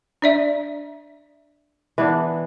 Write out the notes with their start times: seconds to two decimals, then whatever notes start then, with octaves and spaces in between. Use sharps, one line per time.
0.22 D4 D5 E5
1.98 E3 B3 D4